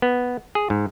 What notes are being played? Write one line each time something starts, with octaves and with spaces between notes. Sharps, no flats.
B3
G#4
G#2